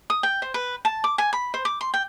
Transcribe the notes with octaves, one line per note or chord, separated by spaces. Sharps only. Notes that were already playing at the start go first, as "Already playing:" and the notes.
D#6
G5
C5
B4
A5
D6
G#5
B5
C5
D6
C6
G5